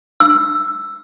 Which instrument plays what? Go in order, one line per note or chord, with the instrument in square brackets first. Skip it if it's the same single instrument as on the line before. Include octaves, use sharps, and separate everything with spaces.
[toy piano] E6